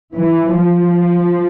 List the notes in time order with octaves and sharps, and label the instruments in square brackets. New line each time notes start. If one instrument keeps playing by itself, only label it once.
[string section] E3
F3